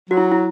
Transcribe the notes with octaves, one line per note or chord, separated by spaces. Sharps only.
F#3 F#4
E4
E4